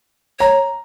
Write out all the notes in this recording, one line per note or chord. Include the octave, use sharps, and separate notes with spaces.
C#5 A#5